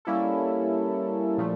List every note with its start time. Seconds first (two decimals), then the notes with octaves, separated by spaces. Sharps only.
0.05 G3 A#3 C#4 E4 A4
1.38 A#2 F3 A3